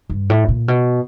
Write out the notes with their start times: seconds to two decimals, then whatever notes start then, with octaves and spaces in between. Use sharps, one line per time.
0.10 G2
0.30 A2
0.49 A#2
0.68 B2